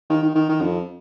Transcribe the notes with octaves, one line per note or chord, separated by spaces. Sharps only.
D#3
D#3
D#3
D#3
F2